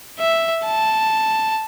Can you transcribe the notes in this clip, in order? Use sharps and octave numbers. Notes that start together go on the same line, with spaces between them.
E5
A5